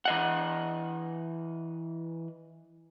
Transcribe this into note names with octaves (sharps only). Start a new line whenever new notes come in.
E3 D#5 F#5